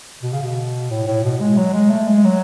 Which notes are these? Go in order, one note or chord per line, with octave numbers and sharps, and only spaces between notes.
B2
C#3
B2
A2
A2
B2
G#3
F#3
G#3
A3
G#3
F#3